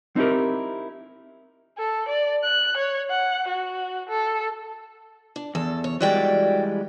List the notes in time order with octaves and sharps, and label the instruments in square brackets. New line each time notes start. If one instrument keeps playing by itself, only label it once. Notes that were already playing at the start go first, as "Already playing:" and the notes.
[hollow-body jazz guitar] C4 D#4 E4 G4 A#4
[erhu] A4
D5
F#6
C#5
F#5
F#4
A4
[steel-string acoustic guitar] D4
[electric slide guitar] E2 [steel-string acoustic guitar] A4
[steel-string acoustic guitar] C#5
[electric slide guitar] E3 G3 G#3 [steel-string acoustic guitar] F#4 D5 G5